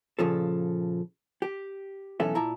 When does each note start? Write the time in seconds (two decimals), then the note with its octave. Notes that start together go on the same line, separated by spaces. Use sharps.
0.19 A#2 C#3 F3 A4
1.42 G4
2.20 B1 E3 C#4 A4 E5
2.35 A#2 E4 A5 A#5